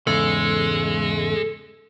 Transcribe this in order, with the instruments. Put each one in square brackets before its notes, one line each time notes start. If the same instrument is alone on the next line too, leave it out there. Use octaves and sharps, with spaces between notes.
[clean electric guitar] E2 G#2 C#3 [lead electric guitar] G#3 [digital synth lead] A4